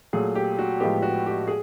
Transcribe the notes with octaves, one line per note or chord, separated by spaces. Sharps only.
A#2 F#3 A3 G#4
G4
F#4
A2 F3 G#3 B3 G4
F#4
G4
G#4